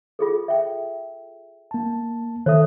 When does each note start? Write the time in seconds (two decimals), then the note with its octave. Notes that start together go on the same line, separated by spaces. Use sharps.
0.19 F4 G#4 A4
0.48 E5 G5
1.71 A#3 A5
2.46 D#3 A4 C#5 E5 D#6